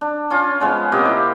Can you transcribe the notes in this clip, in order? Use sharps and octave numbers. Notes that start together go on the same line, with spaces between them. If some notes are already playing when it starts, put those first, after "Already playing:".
D4
C#4 F4
F3 G#3 B3 C#4
C3 A#3 G4 D#5
E4